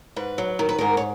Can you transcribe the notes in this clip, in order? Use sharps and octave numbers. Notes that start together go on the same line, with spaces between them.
G#2 B4
F#3
D#3 A#4
B4
G#2 A#4
C#5